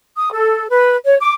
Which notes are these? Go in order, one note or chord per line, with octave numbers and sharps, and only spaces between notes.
D#6
A4
B4
C#5
D6